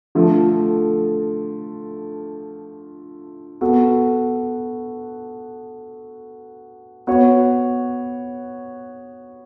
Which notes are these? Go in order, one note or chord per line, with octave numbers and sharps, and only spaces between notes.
D3 F3 A3 F4 A4
B3 F#4 A4
B3 F#4 C#5